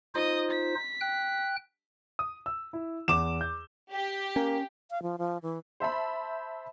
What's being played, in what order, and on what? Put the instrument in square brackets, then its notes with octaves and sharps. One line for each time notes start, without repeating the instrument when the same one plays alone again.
[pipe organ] D#4 F4 C5 [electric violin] D#5 D#6
[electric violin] B6
[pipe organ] G5 F#6
[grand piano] D#6
E6
E4
[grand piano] E2 [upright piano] D6 E7
[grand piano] G6
[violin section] G4
[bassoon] A#3 [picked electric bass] C#4
[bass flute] F5
F3
F3
E3
[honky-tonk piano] C5 E5 A5 B5